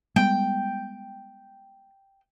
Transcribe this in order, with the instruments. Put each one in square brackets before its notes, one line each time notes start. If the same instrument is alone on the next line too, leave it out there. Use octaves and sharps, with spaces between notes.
[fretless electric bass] G3 G#3 B3 [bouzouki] G5